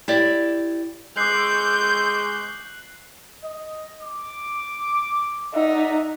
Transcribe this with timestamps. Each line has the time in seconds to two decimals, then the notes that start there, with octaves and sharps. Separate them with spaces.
0.08 E4 G4 D5
1.17 G#3 C#6 D6 E6 F#6 G6 C7 F#7
3.43 D#5
4.02 D6
5.54 D#4 D5 E5 F#5